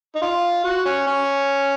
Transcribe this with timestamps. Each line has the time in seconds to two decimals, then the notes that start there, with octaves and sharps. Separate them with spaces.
0.15 D#4
0.22 F4
0.64 F#4
0.85 C#4
1.07 C#4